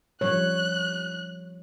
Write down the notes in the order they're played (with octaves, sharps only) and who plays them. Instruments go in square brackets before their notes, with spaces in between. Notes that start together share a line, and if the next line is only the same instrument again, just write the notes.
[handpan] F3 G3 C#5 [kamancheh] F#6